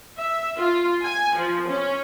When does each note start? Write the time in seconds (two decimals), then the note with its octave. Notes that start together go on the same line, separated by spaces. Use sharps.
0.18 E5
0.57 F4
1.02 G#5
1.36 F3
1.68 C#4